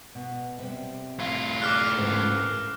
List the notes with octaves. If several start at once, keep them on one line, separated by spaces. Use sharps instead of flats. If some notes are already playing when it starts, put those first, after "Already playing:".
B2
C3 G3
A2 F4
G#4 D5 D6 F6 F#6
G#2 C#3 E3
A#4